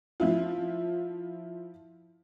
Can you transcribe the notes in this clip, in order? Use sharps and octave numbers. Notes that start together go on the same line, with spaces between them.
F3 E4 F4